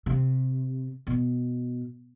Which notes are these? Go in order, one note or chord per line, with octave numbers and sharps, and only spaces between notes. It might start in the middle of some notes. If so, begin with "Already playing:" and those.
C3
B2